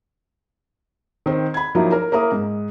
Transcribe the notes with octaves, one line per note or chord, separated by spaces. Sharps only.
D#3 C4
B5 G#6
F3 F#3 A#3 D#4 E4
A#4
A#3 E4 A#4 D#6
G#2